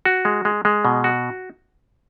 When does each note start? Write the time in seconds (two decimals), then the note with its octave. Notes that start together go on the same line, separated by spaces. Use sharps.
0.05 F#4
0.25 G#3
0.45 G#3
0.65 G#3
0.85 B2
1.04 F#4